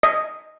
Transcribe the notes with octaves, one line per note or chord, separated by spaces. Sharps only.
D#5